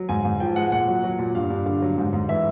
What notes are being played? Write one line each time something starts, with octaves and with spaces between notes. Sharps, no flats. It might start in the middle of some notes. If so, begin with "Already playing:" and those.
Already playing: F#3
G#2 G#5
G#2
F3 G5
G#3 F#5
A#2 F#5
F#3
F#3
A#2
G2 F5
G2
D3 F5
F#3
G#2
G#2
E3 E5